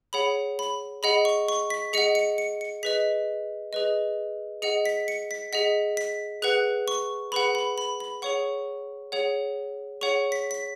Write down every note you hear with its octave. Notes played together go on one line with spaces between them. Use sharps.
G#4 C#5 F#5 B5
B5
G#4 D#5 F#5 B5
C#6
C#6
B6
G#4 D#5 F#5 C#7
C#7
C#7
C#7
G#4 B4 D#5 B6
G#4 B4 D#5
G#4 D#5 F#5 C#7
B6
C#7
B6
G#4 D#5 F#5 B6
B6
G#4 B4 F#5 F#6
C#6
G#4 B4 F#5 B5
B5
B5
B5
G#4 C#5 F#5 C#6
G#4 C#5 F#5
G#4 C#5 F#5 C#6
B6
B6